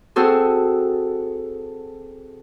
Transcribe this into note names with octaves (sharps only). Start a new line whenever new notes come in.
C4 F#4 G#4 A4 C5